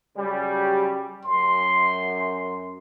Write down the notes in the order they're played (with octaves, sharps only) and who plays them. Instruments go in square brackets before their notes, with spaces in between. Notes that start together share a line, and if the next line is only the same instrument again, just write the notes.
[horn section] C#3 F#3 G3
[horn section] F#2 [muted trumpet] C6